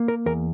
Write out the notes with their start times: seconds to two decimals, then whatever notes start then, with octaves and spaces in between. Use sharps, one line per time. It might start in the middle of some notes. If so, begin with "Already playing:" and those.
Already playing: A#3
0.08 A#4
0.26 E2 A#4